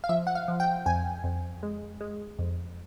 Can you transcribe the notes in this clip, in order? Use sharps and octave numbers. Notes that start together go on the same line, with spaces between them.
F5
F3 E5
F#5
F5
F3
G5
F2 G#5
F2
G#3
G#3
F2